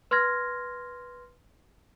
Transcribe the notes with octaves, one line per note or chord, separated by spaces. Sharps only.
B4 C6 F6 G#6 A#6